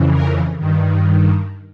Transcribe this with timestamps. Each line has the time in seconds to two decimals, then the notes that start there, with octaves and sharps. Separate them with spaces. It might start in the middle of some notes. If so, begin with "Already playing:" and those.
Already playing: F2 C#3 E3
0.12 A#4
0.58 G2 D#3